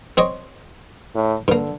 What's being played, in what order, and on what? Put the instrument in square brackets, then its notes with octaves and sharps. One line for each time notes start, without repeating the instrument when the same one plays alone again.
[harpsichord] C4 C#5 D#5
[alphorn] A2
[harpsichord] G2 A#3 [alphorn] D3